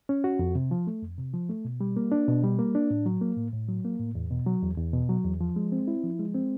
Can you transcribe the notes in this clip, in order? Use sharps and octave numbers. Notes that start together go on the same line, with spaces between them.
C#4
F#4
F2
C3
F3
A3
F2
C3
F3
A3
B2
G3
A#3
D4
B2
G3
A#3
D4
A2
F#3
A#3
A2
A2
F#3
A#3
A2
E2
B2
F#3
E2
E2
B2
F#3
E2
F3
G#3
C4
E4
F3
G#3
C4